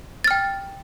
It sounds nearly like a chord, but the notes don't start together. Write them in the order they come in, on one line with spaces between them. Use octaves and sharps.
A6 F6 G5